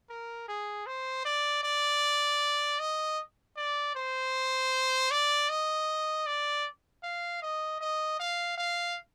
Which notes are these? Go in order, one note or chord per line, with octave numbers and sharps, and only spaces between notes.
A#4
G#4
C5
D5
D5
D#5
D5
C5
D5
D#5
D5
F5
D#5
D#5
F5
F5